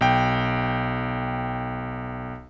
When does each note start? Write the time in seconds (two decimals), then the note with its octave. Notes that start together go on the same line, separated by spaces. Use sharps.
0.01 B1 G5